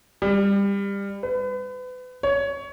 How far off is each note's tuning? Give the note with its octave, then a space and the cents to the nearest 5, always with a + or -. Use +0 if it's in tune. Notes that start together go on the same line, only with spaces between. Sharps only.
G3 +25
B4 +35
C#5 +15